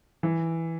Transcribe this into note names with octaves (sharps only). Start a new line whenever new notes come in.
E3